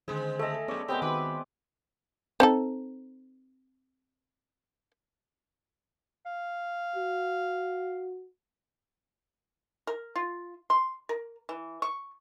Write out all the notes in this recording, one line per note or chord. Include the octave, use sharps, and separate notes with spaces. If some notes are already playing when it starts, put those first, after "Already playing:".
D3 D#3 G#3 C4 G#4
A3 A4 D#5 E5 G#5
F#2 B3 C#4 G#4 D5 C#6
C3 G#3 B3 C4 G4 C#5 D#6 G6
D#3 F#4 B4 G5 G#5 D6
C4 D#4 A4
F5
F#4
A#4
F4
C6
A#4
E3
C#6